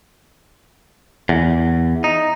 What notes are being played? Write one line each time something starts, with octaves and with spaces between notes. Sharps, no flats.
E2
D#4